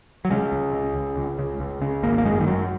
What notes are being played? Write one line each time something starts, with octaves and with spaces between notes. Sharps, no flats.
F#3
C#3 G#3
C#2
C#3
C#2
C#2
C#3
C#2
C#3
G#1 A#3
A#3
F#2 G#3
D#3
F#2 F#3